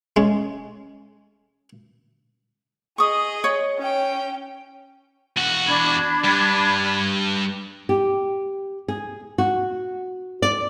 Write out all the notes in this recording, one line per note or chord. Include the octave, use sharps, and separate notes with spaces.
G#3 C#4
G#4 D#5 C#6 D#6
C#5
C#4 G5
E2 F#4
D4 B5 G#6
G2
G4
G#4
F#4
D5